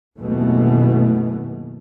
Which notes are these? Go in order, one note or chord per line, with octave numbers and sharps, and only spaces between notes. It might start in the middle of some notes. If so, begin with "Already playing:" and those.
F#1 D#2 B2 E3 A3